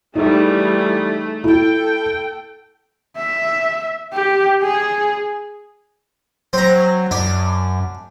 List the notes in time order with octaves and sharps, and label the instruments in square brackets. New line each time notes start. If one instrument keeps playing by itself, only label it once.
[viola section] E3 G3 G#4 [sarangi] A3 [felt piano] D#4
[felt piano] E4 [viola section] A4 G5
[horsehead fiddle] E5
G4
G#4
[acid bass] F#3 [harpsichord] C4 A#5
[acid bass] F#2 [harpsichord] D4